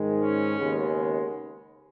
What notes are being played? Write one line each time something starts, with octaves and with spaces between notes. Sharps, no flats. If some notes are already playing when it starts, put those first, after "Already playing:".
Already playing: G#2 D#3 G#3
C#4
D#2 C#3 G#3 B3